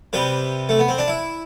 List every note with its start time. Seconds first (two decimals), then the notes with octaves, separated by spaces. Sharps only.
0.13 C3 G3 B4
0.69 A3
0.79 B3
0.88 C4
0.98 D4
1.08 E4